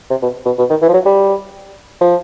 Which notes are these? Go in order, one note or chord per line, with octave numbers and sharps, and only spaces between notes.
C3
B2
B2
B2
D#3
E3
F3
F#3
G3
F3